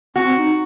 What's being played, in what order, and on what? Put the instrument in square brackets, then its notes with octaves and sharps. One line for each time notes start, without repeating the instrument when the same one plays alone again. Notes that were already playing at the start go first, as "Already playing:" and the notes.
[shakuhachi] C4 [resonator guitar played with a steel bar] F#4
[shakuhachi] D#4